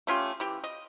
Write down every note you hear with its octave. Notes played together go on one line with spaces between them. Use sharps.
A3 C#4 F4 G4
E3 G4
D#5